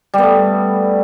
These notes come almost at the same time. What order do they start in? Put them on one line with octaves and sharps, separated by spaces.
G3 B3 A3